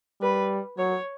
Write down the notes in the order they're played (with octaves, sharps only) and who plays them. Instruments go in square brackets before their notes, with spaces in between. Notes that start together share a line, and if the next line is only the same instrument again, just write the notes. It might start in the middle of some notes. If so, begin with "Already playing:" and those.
[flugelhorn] G3 [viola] B4
[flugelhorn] F#3 [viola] C#5